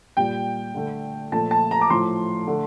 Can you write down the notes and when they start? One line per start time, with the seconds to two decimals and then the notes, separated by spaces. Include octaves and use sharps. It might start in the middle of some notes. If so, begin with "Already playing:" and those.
0.17 A#2 G3 G5
0.75 D3 A3
1.32 A#2 F3 A3 A5
1.51 A5
1.71 A#5
1.81 D6
1.90 A2 F3 A3 C6
2.47 D3 A3